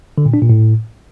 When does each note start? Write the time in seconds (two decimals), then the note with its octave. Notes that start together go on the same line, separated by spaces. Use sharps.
0.18 D3
0.26 A#2
0.34 D4
0.42 A#2
0.50 A2